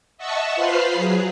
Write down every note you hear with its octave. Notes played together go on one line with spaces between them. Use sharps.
D#5 E5 F#5 A5 C#6 E6
F4 B4 C5 B5 F6 C7
F#3 G#4